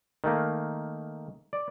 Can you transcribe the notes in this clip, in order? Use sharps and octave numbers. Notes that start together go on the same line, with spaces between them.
D#3 A3 A#3
D5